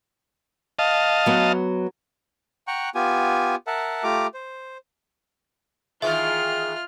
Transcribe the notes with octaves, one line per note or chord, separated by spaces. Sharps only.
D#5 F5 A5
F#3 B3
F#5 G5 A#5 C#6 F#6
B3 F4 G4 G#5
A#4 E5 F#5 A5
A3 F4 G4 A#5 D6
C5
D#3 E3 G#3 F4 E5 F6